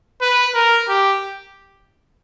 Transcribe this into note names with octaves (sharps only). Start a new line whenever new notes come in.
B4
A#4
G4